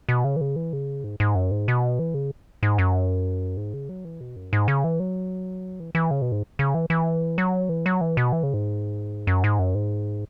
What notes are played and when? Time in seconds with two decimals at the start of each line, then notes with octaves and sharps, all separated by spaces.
0.09 B2
0.24 C#3
0.36 E3
0.41 C#3
0.56 E3
0.73 C#3
1.04 G#2
1.20 G#2
1.35 F#2
1.51 G#2
1.68 B2
1.99 E3
2.14 C#3
2.63 G#2
2.78 F#2
3.57 G#2
3.74 C#3
3.89 F#3
4.05 E3
4.21 B2
4.36 F#2
4.53 G#2
4.68 C#3
4.84 E3
5.00 F#3
5.80 E3
5.95 E3
6.11 C#3
6.22 B2
6.32 G#2
6.59 C#3
6.74 E3
6.90 E3
7.38 F#3
7.69 E3
7.86 F#3
8.01 E3
8.17 B2
8.32 E3
8.43 C#3
8.54 G#2
9.27 F#2
9.44 G#2
9.59 F#2
9.75 G#2